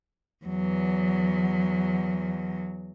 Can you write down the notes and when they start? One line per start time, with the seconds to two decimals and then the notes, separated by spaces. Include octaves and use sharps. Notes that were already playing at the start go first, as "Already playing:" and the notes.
0.45 E2 F#3